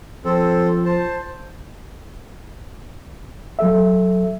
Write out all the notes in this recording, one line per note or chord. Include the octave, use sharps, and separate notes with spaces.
F3 C4 A4
C5 A5
F#3 A4 E5